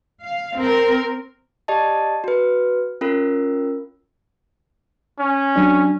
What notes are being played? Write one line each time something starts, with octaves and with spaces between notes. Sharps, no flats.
F5
C4 A#4
G4 D5 D#5 A5
F#4 B4
C#4 F4 A#4
C#4
F#3 D4